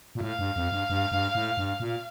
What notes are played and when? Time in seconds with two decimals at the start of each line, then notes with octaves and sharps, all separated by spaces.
0.15 A#2
0.21 A2 F5
0.39 G2
0.56 F2
0.72 G2
0.90 G2
1.12 G2
1.35 A2
1.57 G2
1.80 A#2